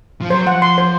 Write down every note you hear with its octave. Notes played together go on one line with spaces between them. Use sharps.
F3
F#3 C5
F3 F#5
C6
C5